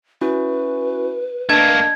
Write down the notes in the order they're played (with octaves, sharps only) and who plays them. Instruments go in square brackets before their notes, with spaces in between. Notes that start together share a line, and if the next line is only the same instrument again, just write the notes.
[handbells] C#4 E4 F#4 [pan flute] B4
[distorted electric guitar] A3 A#3 [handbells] D4 D#5 A5 [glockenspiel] G#6